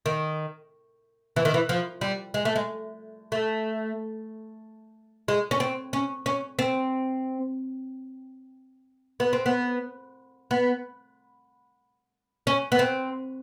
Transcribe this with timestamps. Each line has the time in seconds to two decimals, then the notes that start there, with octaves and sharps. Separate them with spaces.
0.06 D#3
1.36 E3
1.45 D#3
1.54 E3
1.69 F3
2.01 G3
2.34 G#3
2.45 A3
2.56 G#3
3.32 A3
5.28 G#3
5.51 C#4
5.60 C4
5.93 C#4
6.26 C#4
6.59 C4
9.20 B3
9.33 C4
9.46 B3
10.51 B3
12.47 C#4
12.72 B3
12.79 C4